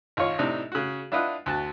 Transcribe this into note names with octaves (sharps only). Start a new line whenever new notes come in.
G#1 F4 C#5
A2 C3 D4 D#4
C#3 F#4
D4 E4 F4 B4 D#5 F#5
D2 F#4 A5